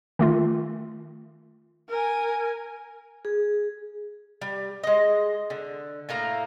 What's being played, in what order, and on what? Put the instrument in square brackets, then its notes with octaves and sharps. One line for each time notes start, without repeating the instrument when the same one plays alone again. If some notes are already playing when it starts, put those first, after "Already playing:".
[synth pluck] D#3 A3 F4
[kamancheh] A#4 G#5
[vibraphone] G#4
[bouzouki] G3
G#3 D#5
D3
A2 A3 A#3 A#5